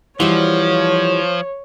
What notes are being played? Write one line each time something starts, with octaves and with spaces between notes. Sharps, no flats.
E3 F3 G3 F#4 C#5 D#5